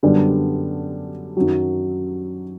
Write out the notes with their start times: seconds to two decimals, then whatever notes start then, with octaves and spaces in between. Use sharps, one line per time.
0.03 F#2 D3 G3 B3 D4
1.37 F#2 D#3 F#3